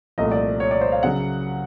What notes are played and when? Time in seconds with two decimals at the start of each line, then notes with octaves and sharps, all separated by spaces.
0.18 C2 A#2 F3 A3 D#5
0.32 D5
0.60 C#5
0.71 D5
0.81 C5
0.92 F5
1.03 C#3 F#3 F#5